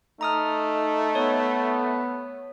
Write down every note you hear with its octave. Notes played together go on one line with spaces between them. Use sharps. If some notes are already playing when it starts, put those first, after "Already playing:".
A3 D#4 A#5 D#6 F6
B3 C#5